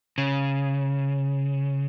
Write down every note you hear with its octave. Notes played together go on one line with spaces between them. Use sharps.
C#3